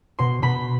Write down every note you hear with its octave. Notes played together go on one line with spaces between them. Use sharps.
B2 C6
B2 B5